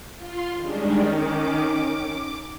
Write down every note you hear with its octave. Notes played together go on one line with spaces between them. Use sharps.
F4 C6
D#3 G3 G#3 C#4 D4
D6